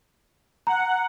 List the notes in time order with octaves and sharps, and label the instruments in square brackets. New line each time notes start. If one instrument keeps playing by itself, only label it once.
[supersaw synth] F#5 [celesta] A#5